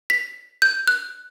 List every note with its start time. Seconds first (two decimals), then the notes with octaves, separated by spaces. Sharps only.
0.10 B6
0.62 G6
0.87 F#6